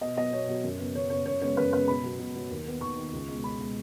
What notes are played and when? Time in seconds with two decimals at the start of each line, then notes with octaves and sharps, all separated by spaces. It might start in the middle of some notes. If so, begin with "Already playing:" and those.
0.01 B2 D#5
0.17 F#3 B3 D#5
0.32 B2 C#5
0.48 F#3 B3
0.64 F#2
0.79 C#3 B3
0.95 F#2 C#5
1.10 C#3 B3 C#5
1.25 F#2 C#5
1.41 C#3 G#3 B3 C#5
1.57 F#2 B4
1.73 C#3 G#3 B3 B4
1.88 B2 B5
2.03 F#3 B3
2.19 B2
2.35 F#3 B3
2.50 D#2
2.66 D#3 B3
2.81 D#2 C#6
2.97 D#3 B3
3.12 C#2
3.28 B2 G#3
3.44 C#2 B5
3.60 B2 G#3